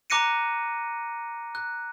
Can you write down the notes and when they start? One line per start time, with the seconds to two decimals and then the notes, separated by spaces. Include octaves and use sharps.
0.10 A#5 D6 F#6 A#6 C#7 D#7
1.55 F#6